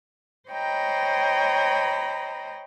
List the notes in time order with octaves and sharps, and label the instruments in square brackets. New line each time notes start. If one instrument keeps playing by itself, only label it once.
[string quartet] C5 C#5 D#5 G5 A#5 B5